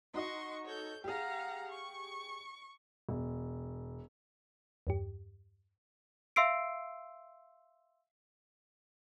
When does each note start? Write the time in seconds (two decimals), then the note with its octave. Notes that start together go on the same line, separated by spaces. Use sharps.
0.14 D#4 F#4 D#5 C6 C#6
0.65 A4 C#5 G6
1.04 G4 G#4 F5 F#5 A#5
1.69 C#6
3.09 E1
4.87 E2 G2 G4
6.36 E5 F5 C6 E6 C7 D7